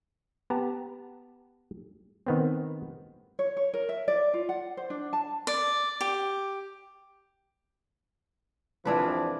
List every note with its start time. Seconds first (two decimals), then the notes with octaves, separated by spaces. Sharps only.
0.50 B3 G4 A5 A#5
2.26 D#3 B3 C4
3.39 C#5
3.57 C#5
3.74 A#4
3.89 E5
4.08 D5
4.34 F4
4.49 F#5
4.77 C5
4.90 D4
5.13 A5
5.47 D5
6.01 G4
8.85 C2 F2 E3 F3 D4 B4